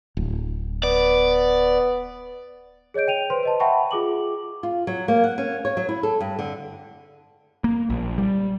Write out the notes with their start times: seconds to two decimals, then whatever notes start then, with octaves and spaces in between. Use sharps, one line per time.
0.17 D1
0.83 B3 D5
2.94 G#4 C#5 D#5 G6 D7
3.08 G5 D#7 F7
3.30 B4 C5 C6
3.43 B4 D#5 A5
3.60 E5 F#5 G5 A5 B5 C#6
3.91 F4 G#4 D6 F#7
4.63 F4
4.87 F#3
5.08 A#3
5.24 F#5
5.38 C#4
5.65 C#5
5.77 F#3
5.89 E4
6.03 A4
6.20 G2
6.39 D3
7.64 A#3
7.90 A#1
8.18 G3